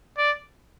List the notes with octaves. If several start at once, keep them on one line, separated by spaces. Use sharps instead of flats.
D5